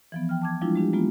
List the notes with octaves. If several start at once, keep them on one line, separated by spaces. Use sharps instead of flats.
E3 F3 B3
G5 F6
A5 D6 G#6
F3 G3 G#3 D4 E4 F4
G#3 D4 G4
E3 G#3 A#3 B3 F4